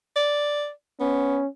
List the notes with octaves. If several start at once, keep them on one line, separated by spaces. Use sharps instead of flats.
D5
B3 C#4